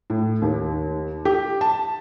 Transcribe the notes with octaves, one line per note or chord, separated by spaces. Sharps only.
A2
D#2
G4
A5